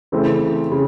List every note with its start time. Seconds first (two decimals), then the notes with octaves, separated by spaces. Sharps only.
0.12 C#3 E3 A3 C4
0.72 C#3